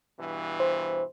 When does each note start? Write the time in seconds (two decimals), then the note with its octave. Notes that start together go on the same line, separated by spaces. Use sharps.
0.19 G2 B2 E3
0.60 C5